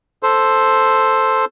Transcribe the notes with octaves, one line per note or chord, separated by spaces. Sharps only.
A4 C5